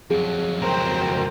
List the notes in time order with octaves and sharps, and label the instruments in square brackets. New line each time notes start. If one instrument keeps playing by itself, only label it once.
[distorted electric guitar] F2 F#3 [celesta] G#4
[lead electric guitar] C#2 A#4 [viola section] C5 G5